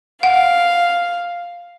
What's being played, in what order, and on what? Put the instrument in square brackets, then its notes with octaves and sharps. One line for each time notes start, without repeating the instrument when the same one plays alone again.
[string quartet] F5 [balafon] F#5